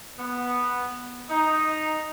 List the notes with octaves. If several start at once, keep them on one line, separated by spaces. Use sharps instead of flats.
B3
D#4